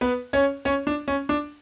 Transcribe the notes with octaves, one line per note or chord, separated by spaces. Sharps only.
B3 B4
C#4 C#5
C#4 C#5
D4
C#4
D4